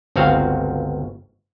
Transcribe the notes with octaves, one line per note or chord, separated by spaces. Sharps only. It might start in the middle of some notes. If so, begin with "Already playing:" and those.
G1 C#2 C4 F#4 F5